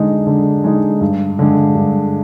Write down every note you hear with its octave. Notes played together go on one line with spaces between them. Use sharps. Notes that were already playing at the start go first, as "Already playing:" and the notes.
Already playing: D3 G#3 D#4
D3
G#3 D#4
G2
D3 G#3
G2